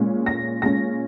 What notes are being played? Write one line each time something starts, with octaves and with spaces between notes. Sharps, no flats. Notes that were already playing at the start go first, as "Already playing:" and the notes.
Already playing: A#2 G#3 C#4
A#6
A#2 G#3 C#4 A#6